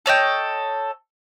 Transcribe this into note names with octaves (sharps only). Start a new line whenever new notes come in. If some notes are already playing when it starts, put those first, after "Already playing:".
A4 C#5 D#5 G5